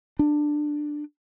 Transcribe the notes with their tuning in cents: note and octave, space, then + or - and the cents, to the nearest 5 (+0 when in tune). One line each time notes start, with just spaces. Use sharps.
D4 +15